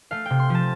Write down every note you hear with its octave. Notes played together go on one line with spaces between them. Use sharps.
A3 F5
C3 G5
C6
F3 A5